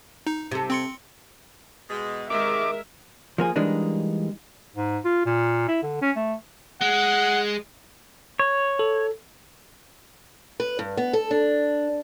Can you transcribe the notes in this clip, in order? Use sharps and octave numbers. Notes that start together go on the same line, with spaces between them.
D#4
C3 A4
C4 C6 C#7
B2 G#3
G#2 C3 D#3 G#3 A#4 E5 D6
F3 A#3 G#4
E3 G3 G#3 A#3 D4 D#4
G#2
F4
A#2
E4
D3
C#4
A3
G#3 F#5
C#5
A4
B4
G2
B3
A4
D4